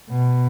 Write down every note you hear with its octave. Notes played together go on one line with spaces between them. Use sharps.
B2